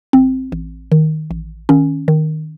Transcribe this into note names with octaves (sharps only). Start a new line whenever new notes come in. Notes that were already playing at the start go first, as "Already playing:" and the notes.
A1 C4
A1
D#3
A1
D#3 C#4
D#3